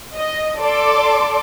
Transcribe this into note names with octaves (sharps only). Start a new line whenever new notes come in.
D#5
A4 D5 C6 D6